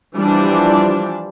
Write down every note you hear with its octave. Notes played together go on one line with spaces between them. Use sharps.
E3 F3 G3 D4